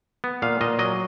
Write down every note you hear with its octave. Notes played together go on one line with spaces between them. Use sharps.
B3
A#2 F5
A#2 D#5
F#3 D#5